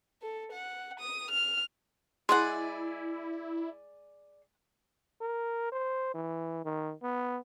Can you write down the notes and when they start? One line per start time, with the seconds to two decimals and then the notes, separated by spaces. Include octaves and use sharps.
0.22 A4
0.52 F#5
0.99 D#6
1.30 F6
2.29 G#3 E4 G#4 D5 F#5 C6
5.21 A#4
5.72 C5
6.14 E3
6.65 D#3
7.03 B3